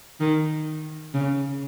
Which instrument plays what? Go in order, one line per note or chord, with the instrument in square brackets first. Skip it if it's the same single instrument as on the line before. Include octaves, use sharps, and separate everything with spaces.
[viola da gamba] D#3
C#3